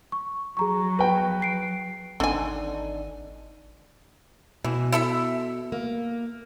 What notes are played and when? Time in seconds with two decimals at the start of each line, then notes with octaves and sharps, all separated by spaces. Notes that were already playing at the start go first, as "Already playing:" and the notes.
0.12 C#6
0.57 F#3 G#4 A#5 C#6
0.99 B4 G5
1.42 C7 D7
2.20 G#1 D3 D4 D#4 G#5
4.64 B2 E3
4.92 E4 A4 E5
5.72 A#3